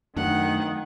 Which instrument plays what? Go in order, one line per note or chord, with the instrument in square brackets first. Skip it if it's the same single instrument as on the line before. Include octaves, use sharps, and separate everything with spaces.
[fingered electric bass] F#2 [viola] D#3 [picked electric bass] F#3 A3 D4 [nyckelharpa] F#5